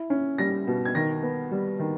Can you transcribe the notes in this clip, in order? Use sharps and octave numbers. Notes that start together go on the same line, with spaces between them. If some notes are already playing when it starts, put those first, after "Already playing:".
Already playing: E4
C#4
G3 A#6
B2
G#6
D#3 A#6
B3
G3
D#3